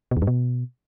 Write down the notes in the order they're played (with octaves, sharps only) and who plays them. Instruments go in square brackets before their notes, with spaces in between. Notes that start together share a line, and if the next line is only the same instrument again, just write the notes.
[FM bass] B2
E2
G2
B2